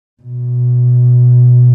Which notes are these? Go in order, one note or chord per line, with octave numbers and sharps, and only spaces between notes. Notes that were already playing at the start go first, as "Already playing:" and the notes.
B2